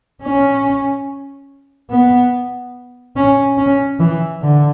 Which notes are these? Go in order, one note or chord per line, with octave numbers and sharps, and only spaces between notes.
C#4
B3
C#4
C#4
E3
D3